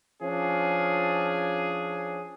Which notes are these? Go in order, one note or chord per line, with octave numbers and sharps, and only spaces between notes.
F3 C#4 D4 G#4